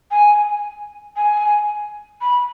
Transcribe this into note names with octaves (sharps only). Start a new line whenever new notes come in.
G#5
G#5
B5